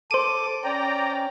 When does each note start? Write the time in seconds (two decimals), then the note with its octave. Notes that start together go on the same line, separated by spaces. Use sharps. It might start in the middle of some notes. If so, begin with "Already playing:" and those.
0.11 A4 C5 D6 D#7
0.64 C#4 D5 G5 A#5